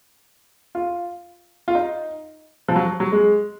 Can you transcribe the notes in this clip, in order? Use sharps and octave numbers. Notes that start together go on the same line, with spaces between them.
F4
F4
D#4
F3
F#3
F#3
G#3